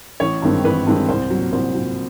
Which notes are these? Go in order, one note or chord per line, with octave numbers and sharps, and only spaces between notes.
A1 C#5
G2 D#3 G#3 C4
A1 B4
G2 D#3 G#3 C4
C2 C5
A#2 F#3
C2 C5
A#2 F#3